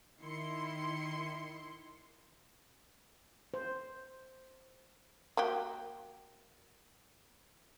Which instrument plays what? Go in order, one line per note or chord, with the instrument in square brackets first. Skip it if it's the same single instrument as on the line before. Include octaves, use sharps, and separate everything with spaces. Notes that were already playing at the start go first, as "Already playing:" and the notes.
[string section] D#3 E4 C6 C#7
[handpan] C5
[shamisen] A#3 F#4 G4